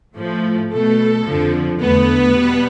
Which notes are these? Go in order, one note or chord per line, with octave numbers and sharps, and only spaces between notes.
A2 F3 A3
B2 A3 A4
F2 D3 F3
E2 D3 A3 B3 B4
B2 G3